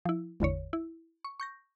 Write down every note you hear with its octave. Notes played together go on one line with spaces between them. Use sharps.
F3 E4
G#1 E2 D3 C#5
E4
C#6
C#6 G6 A#6